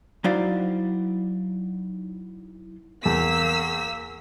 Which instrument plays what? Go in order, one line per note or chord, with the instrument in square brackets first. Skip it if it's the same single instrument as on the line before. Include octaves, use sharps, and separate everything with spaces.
[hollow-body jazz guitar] F#3 D#4 E4 C5 D5 F5
[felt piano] E2 [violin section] A#3 E6 B6